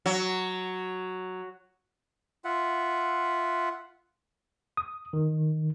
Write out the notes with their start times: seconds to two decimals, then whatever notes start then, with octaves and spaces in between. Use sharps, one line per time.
0.06 F#3
2.45 F4 E5 F#5
4.77 D#6
5.13 D#3